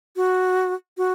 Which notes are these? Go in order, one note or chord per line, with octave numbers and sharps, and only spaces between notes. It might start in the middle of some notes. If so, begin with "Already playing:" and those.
F#4
F#4